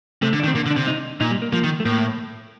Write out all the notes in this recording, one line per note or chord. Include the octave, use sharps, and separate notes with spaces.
C3 A3
D3
D4
D#3
C4
D3 A#3
D3
D4
C3
D#4
A#2 D#4
G3
A#3
F3 A#3
D#3
A3
A2 A#3